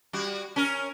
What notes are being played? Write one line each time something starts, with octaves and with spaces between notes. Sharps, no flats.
G3 F#4
C#4 A#4